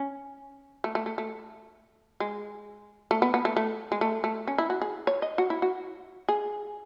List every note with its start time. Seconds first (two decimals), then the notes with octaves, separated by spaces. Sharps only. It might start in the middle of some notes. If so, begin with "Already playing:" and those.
Already playing: C#4
0.84 A3
0.95 A3
1.06 A3
1.18 A3
2.20 G#3
3.11 A3
3.22 B3
3.34 B3
3.45 A3
3.56 A3
3.92 G#3
4.01 A3
4.24 A3
4.47 C#4
4.58 E4
4.70 F#4
4.82 G#4
5.07 C#5
5.22 D#5
5.38 F#4
5.50 E4
5.62 F#4
6.28 G#4